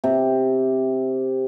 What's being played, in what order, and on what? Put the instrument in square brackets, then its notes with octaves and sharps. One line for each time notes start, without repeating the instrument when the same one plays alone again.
[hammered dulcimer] C3